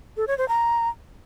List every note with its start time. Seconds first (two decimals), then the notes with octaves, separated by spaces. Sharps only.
0.17 A4
0.27 C#5
0.38 C5
0.48 A#5